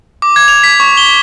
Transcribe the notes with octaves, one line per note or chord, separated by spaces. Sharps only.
D6
G#6
F7
B6
C#6
G7